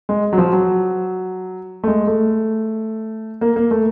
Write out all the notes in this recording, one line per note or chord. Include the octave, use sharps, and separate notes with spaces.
G#3
F#3
F3
F#3
A3
G#3
A3
A#3
A#3
A3